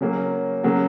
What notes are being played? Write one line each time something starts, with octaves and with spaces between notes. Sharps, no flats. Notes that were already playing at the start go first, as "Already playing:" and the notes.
C#3 F#3 A#3 C#4
C#3 F#3 A#3 F#4